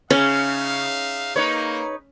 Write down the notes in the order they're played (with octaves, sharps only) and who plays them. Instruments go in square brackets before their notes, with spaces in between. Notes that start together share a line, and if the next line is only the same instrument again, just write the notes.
[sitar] C#3 [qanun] C#4 [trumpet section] D#4 E5 F5
[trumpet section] A#3 [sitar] D#4 B4 C#5